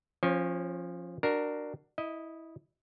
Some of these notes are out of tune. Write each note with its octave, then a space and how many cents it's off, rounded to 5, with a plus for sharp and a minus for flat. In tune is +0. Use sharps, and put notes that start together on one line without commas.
F3 +0 C#4 -30 C#5 -25
D4 +20 F#4 +15 A#4 +0
E4 -15 D#5 +0